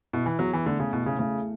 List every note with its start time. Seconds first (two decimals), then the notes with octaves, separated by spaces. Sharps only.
0.13 B2 E4
0.26 E3
0.39 E2 F#3
0.53 E3
0.66 D3 A3
0.80 C#3
0.93 B2 E4
1.06 C#3
1.19 C#3 A3